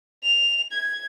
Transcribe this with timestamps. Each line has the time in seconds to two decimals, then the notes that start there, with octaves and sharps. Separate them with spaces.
0.23 F7
0.72 G#6